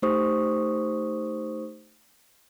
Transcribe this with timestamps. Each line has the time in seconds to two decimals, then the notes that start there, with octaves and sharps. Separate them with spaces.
0.02 A3 D#4 G4 C5 C#6 D#6